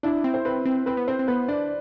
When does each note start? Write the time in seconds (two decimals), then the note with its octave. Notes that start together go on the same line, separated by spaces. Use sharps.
0.03 D4 E4
0.24 C4
0.34 C5
0.45 C4 B4
0.66 C4
0.86 C4 B4
0.97 B3
1.08 C4 C5
1.19 C4
1.28 B3 B4
1.48 D4 D5